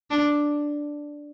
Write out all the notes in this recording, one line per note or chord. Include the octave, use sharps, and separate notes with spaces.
D4